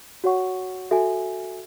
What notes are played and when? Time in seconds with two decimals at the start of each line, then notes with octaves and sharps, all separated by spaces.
0.24 F#4 C#5 F#5 C#6
0.91 F#4 A4 E5 G#5